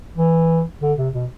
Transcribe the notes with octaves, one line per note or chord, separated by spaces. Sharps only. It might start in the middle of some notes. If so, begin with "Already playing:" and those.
E3
D3
C3
B2